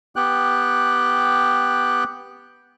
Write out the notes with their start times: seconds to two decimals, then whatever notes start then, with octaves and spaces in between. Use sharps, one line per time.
0.16 B3 G4 G5 F#6